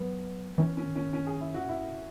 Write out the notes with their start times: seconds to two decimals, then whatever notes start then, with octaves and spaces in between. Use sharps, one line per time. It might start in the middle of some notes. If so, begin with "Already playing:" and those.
Already playing: F#3 B3
0.58 E3 C#4
0.77 C#4
0.85 D#3
0.96 C#4
1.13 C#4
1.27 G#4
1.41 E4
1.54 A#2 F#4
1.67 B2 E4